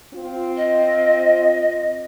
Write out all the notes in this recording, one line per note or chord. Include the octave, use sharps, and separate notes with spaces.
C4 F4
D#5